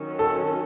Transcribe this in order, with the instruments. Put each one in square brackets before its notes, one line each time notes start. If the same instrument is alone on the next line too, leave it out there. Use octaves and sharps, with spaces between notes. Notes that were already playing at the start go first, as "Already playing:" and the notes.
Already playing: [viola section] D#3 F#3 C#4
[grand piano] A4